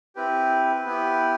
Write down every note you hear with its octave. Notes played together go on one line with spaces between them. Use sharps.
C4 E4 G4 B4
B3 E4 G4